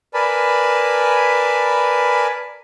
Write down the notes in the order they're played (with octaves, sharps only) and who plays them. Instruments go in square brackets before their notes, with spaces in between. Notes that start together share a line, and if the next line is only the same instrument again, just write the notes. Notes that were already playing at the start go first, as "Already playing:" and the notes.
[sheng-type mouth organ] A#4 B4 D5 G#5 A5 B5